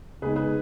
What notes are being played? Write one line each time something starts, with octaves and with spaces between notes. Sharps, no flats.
C#3 G#3 B3 D#4 G#4 B4
G#4 B4